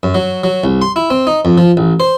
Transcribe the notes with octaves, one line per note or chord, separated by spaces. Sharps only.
F#2
F#3
F#3
C2
C6
E4
C4
D#4
F2
F3
A1
C5